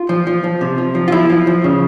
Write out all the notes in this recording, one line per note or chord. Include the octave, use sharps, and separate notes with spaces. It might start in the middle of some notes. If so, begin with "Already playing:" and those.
Already playing: F4
F3
F3
F3
C3
F3
F3
F4
F3 E4
F3
F3
C#3